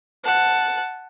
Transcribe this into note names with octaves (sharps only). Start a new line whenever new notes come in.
F#5 A5